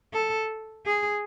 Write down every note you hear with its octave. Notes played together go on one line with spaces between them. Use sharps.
A4
G#4